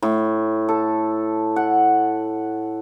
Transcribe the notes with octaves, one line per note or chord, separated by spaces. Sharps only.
A2
A4
F#5